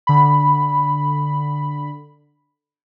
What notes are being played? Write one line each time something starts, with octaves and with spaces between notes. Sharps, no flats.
D3 B5